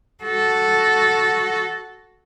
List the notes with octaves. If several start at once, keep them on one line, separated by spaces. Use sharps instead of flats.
F#4 A4